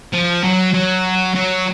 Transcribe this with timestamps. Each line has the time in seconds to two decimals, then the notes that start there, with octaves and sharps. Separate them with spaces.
0.13 F3
0.44 F#3
0.74 F#3
1.35 F#3